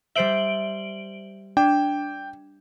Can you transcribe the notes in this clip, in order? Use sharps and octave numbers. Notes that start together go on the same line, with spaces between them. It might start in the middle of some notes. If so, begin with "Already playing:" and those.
G3 C5 E5 D7 F#7 G7
D4 G5